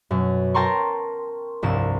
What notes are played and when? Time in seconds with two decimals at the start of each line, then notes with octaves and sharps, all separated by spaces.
0.11 F#2 B2
0.54 A#4 G5 A5 A#5 C6 C#6
1.62 F1 C2 G2 E7